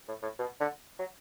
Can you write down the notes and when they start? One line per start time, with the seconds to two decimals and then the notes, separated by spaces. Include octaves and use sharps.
0.08 A2
0.23 A2
0.39 B2
0.60 D3
0.99 F#3